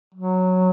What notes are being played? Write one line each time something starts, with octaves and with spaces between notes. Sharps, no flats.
F#3